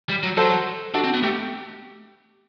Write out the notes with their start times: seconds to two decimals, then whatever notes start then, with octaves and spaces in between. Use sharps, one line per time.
0.09 G3
0.23 F#3
0.37 F#3 A4 C5
0.94 D4 F#4 A4
1.04 C4
1.14 B3
1.23 A3 G4